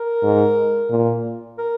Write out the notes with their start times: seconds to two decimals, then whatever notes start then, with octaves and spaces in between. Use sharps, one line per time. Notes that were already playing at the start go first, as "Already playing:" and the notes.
Already playing: A#4
0.23 G#2
0.90 A#2
1.58 A#4